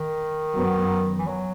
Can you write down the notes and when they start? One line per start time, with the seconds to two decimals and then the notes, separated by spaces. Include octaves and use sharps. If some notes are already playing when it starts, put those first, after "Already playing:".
Already playing: D#3
0.55 F#2 F#3 B3
1.19 E3
1.27 F#3